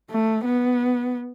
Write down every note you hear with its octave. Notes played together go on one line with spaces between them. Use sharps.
A3
B3